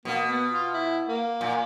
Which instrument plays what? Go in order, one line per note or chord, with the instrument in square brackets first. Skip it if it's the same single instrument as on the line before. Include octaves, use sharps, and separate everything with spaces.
[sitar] B2 [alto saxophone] A#3
[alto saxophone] B3
F4
E4
A#3
[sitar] A#2